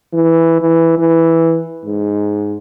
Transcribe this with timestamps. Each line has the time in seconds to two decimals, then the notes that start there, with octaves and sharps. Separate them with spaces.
0.13 E3
0.61 E3
0.98 E3
1.85 G#2